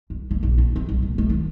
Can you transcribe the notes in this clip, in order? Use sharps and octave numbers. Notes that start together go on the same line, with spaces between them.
C2
A#3
A#1
D4
C4
C2
A#1
A3
D#3